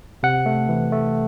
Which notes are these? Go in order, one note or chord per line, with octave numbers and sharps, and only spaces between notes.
C3 F#5
A3
E3
A3